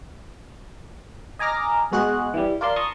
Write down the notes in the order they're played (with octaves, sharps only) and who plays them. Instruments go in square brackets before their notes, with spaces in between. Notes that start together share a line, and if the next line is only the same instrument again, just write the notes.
[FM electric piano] D#5 G#5 A#5 D6 F6 A#6
B2 G#3 F#4 G#4 F#6
E3 G3
F4 A#4 D5 A5 C6
A5 A#5 C6 C#6 D#6